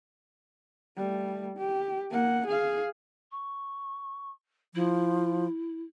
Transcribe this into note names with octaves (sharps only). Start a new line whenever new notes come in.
G3 A3
G4
A#3 F#5
G#4 F5
C#6
F3 E4